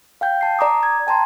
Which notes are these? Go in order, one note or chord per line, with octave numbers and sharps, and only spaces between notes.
F5 G5 G6
A5 C7
D5 A#5 D6 D#6
G#6
G5 A5 A#5 C6